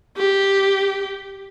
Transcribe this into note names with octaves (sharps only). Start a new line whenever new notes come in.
G4